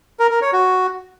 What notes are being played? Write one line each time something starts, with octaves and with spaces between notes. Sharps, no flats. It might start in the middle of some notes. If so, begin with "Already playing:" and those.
A#4
A#4
C#5
F#4